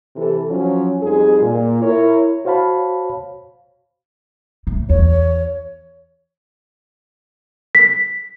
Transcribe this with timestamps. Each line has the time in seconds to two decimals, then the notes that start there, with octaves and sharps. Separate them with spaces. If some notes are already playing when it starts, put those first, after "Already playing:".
0.16 C3 E3 A4
0.49 F3 F#3 C#4
1.02 F2 G3 D#4 F4 G#4
1.42 A#2
1.82 E4 A#4 C#5
2.45 F#4 C5 C#5 F5 A5 B5
4.67 A2
4.89 E2 C#5
7.75 B6